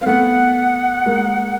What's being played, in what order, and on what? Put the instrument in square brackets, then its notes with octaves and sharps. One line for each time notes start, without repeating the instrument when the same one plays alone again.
[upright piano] C4 [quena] F5
[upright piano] A3 B3 [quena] F#5
[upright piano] G#3 A#3